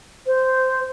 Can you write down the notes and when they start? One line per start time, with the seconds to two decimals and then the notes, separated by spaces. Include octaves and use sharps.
0.26 C5